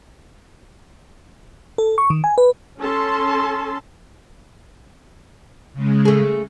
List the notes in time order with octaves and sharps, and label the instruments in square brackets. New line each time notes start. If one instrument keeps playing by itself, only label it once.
[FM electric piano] A4
C#6
D#3
G#5
B4
[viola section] C#4 A4 A5 C6
[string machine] C#3 G#3
[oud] A3 G#4